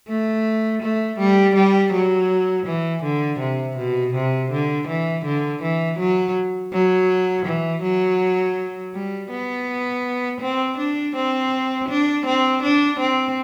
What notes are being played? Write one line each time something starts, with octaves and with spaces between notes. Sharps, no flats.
A3
A3
G3
G3
F#3
E3
D3
C3
B2
C3
D3
E3
D3
E3
F#3
F#3
E3
F#3
G3
B3
C4
D4
C4
D4
C4
D4
C4